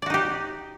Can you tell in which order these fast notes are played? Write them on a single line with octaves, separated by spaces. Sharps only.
D5 F#4 D#4 G4